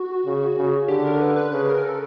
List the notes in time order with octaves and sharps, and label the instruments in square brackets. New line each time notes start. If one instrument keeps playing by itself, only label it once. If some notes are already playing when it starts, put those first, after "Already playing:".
Already playing: [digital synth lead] F#4
[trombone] C#3
C#3
[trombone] D3 [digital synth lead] G4
[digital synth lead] A#4
B4
B4
[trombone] C#3 [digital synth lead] B4
[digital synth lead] A#4
A4